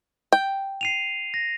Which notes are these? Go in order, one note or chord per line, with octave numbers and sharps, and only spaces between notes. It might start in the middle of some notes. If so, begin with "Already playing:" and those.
G5
C7 D#7 F7
A#6